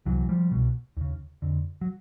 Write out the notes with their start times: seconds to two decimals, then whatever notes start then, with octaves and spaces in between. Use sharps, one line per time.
0.06 C2 C3 E3 F#3
0.29 F3 G3
0.52 C2 B2
0.97 D#2 C#3
1.42 F2 D3
1.81 F#3